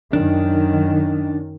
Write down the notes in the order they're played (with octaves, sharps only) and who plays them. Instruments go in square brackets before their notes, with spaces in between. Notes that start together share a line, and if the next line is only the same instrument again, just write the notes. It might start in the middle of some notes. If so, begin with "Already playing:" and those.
[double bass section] F#2 D#3 [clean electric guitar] D4